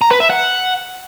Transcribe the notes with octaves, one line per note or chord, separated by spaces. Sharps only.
A#5
B4
E5
F#5